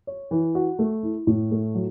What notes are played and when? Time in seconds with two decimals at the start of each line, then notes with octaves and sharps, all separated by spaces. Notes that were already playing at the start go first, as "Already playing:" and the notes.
0.07 C#5
0.31 E3
0.55 F#4
0.79 A3
1.03 E4
1.27 A2
1.51 A3
1.75 F#3